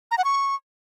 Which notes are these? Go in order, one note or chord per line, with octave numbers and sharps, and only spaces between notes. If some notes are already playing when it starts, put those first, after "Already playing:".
A#5
F#5
C#6